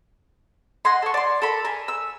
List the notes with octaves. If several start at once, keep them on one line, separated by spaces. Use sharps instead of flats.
D#5 F#5 G#5 C6
A4 C#6
D5 C6
A4 A#4 B5
A#4 G#5
E6